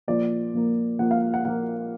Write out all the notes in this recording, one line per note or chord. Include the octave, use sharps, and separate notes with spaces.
A#2 F3 A#3 D5
A#2 F3 A#3
A#2 F3 A#3 F#5
F5
F#5
A#2 F3 A#3 F#5